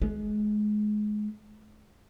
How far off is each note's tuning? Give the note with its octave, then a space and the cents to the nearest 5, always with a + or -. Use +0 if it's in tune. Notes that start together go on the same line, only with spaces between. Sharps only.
G#3 +25